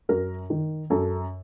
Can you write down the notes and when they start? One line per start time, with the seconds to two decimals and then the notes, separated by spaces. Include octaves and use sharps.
0.09 F#2 A#4
0.50 D#3
0.90 F#2 A4